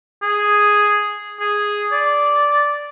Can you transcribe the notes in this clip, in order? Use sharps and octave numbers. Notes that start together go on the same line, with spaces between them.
G#4
G#4
D5